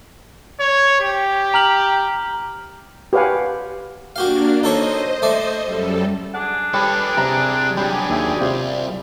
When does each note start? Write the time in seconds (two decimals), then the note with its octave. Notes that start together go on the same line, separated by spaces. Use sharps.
0.60 C#5
1.01 G4
1.54 A#5 F6 F#7
3.13 G4 B4 C#5 F5 F#5 G#5
4.16 A#3 D4 F#4 G4 F5
4.63 D#4 A4 C5 C#5 D#5
5.22 A3 D5
5.63 F#2 G3 A4
6.34 D4 G#4 F#5
6.74 G3 A4 B4 C#5
7.17 C3 G3 C4 A#5
7.77 F#3 G3 D4 G4 G#4
8.10 D#2 E5
8.41 C2 C3 F4